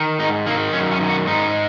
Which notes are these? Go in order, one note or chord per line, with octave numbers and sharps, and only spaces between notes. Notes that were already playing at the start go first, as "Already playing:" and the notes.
Already playing: D#3
G#2 D#4
D#3 A#3
F#2 C#4
C#4
D#3
F#4
G#2 D#4